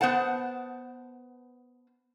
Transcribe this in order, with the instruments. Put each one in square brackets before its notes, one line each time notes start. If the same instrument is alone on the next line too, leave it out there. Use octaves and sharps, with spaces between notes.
[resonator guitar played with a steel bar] B3 C5 F#5 A5